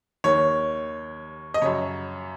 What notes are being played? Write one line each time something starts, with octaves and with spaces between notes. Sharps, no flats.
D#2 D#3 C#5
D#5
F#2 C#3 C#5